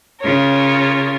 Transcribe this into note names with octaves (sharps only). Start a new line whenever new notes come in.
C#3 F4 A#4 C#5